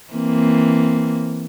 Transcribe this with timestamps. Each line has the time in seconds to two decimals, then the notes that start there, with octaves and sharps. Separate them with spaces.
0.14 E3 A#3 C4